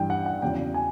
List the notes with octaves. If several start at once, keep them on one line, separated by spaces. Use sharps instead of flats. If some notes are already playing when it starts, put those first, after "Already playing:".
Already playing: G2 E3 G3 G5
F#5
F#5
E2 C#3 F#3 G5
G#5